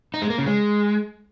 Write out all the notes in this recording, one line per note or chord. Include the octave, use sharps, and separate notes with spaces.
D#4
G#3
A#3
C#3
G#3